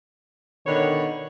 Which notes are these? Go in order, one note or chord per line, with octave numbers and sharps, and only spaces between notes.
B2 D3 D#3 C#5